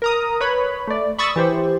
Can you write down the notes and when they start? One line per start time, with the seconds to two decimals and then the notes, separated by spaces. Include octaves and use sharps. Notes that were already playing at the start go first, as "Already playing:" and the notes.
0.02 A#4 A#5 D#6
0.41 B4 C#5 B5
0.87 A3 D5
1.18 B5 C#6 D#6 E6 A6
1.36 E3 G4 C5